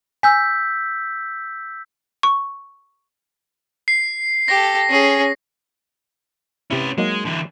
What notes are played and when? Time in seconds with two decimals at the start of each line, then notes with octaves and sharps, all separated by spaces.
0.23 G#5 E6 G6 B6
2.23 C#6
3.88 C7
4.48 G4 A4 A#6
4.89 C#4 G#4
6.70 C3 C#4 E4 B4
6.98 F#3 G#3 A#3 D#4
7.25 D3 E3